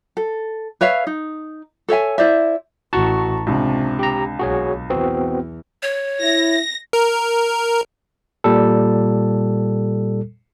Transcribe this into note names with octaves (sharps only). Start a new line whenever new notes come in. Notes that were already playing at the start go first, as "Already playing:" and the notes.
A4
B4 C#5 E5 F5
D#4
A4 C#5 E5 G#5
E4 C5 D5 E5
A1 F#4 A5 A#5 C#6
C#2 C3 D4
G4 A#5
B1 F#4 G#4 C#5
E2 B3 C4 F#4
C#5
E4 A#6
A#4
A#2 G3 A4